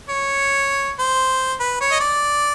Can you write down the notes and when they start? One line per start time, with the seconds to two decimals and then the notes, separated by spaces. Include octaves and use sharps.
0.09 C#5
0.99 C5
1.60 B4
1.81 C#5
1.91 D#5
2.00 D5